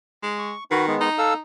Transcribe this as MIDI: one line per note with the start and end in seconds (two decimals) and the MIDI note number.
0.23 0.52 56
0.39 0.64 85
0.71 0.95 51
0.71 0.86 66
0.71 0.86 71
0.87 1.09 56
0.87 1.09 59
1.01 1.39 63
1.18 1.34 69
1.18 1.34 77
1.18 1.34 88